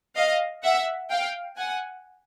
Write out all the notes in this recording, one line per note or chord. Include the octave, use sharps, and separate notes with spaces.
D#5 F5
E5 F#5
F5 G5
F#5 G#5